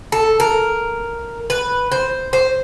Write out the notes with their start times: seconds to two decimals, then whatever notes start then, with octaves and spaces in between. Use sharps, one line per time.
0.12 A4
0.40 A#4
1.50 B4
1.92 C5
2.33 C5